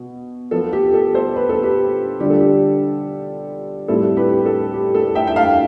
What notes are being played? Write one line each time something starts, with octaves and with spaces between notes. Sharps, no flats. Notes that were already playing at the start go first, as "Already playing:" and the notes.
Already playing: B2
F3 B3 F4 A4
G4
A4
A4 C5
B4
A4
G4 B4
D3 G3 D4 F4 G4
A4
G4
A2 G3 C4 E4 A4
G4 B4
A4
G4
A4
E5 G5
G5
F5 A5